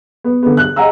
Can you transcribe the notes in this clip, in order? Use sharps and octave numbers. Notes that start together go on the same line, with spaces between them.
B3
D3 B3
F#6
D#5 F#5 G#5 A#5 E6